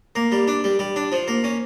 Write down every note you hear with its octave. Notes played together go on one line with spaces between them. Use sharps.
A#3
G3
D4
G3
G3
D4
F3
A#3
C#4